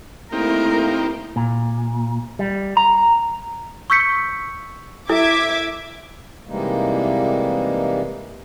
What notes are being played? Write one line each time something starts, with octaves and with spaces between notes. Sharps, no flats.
A3 A#3 C4 D#4 E4 G4 A#4
A#2
G3
A#5
C#6 E6 G6 B6 C#7
E4 A4 E5 D6 G#6
C3 E3 G3 G#3 A#3 D#4